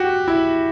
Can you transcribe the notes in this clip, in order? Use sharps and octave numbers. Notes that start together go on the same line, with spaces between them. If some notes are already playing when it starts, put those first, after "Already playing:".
Already playing: F#4 G4
E4